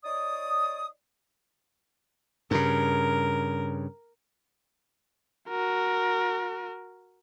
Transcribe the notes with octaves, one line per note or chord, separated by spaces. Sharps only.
D#4 C#5 D5 D#6
G2 C#3 A#4
F#4 A#4